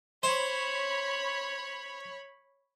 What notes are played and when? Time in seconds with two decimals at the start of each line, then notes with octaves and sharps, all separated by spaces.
0.23 C5 C#5 B5